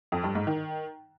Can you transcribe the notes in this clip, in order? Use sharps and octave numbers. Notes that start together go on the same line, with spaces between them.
F2
G2
G#2
D#3